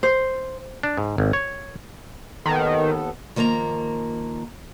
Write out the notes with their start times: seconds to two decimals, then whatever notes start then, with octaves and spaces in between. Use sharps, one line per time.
0.03 C5
0.83 D4
0.98 G#2
1.18 G#1
1.33 C#5
2.46 D#2 D#3 B3 A4
3.36 D#3 F3 A#3 D5 A#5